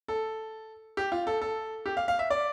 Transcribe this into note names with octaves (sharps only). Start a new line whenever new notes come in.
A4
G4
F4
A4
A4
G4
F5
F5
E5
D5